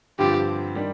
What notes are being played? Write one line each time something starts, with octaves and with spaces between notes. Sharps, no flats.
G2 D3 F3 C4 F4 G4
D#3 G3 D4